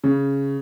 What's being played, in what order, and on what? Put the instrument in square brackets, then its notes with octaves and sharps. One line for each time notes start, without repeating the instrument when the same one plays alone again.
[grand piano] C#3